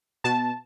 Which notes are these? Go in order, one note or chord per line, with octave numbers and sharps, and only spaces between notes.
B2 A5